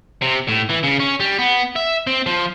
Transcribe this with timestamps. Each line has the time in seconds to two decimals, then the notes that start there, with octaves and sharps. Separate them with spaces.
0.22 C3
0.49 A2
0.70 E3
0.84 C#3
1.00 C#4
1.20 G3
1.38 B3
1.76 E5
2.07 C4
2.26 F3